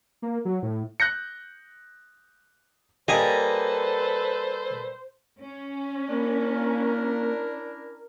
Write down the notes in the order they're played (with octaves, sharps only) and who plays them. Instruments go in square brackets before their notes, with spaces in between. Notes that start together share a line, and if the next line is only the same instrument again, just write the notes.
[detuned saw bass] A#3
F#3
A2
[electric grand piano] F#6 G6 A#6 C#7
[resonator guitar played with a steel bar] G3 A#3 [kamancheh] A4 B4 [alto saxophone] C5 [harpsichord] D#5 G#5 D#6
[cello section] C#4
[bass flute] A#3 [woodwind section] D4 E4 A#4